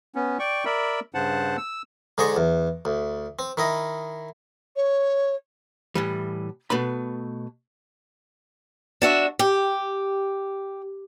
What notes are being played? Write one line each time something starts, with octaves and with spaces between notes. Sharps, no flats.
B3 C#4
D5 G5 C#6
A#4 D5 E5 B5
G2 C#3 C5 F#5 A5
E6
G#2 D3 G#4 C5 D#5 C#6
E2
D2
C4
D#3 E4 D#5
C#5
A2 E3 G3
B2 A3 B4 B5
D4 F#4 E5
G4